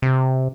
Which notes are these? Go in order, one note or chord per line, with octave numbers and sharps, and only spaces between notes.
C3